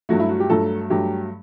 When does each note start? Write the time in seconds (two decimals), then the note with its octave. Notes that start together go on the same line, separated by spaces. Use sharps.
0.09 G2 F#3 A3 F#4
0.20 E4
0.29 F#4
0.40 G4
0.50 G2 F#3 A3 A4
0.90 G2 F#3 A3 G4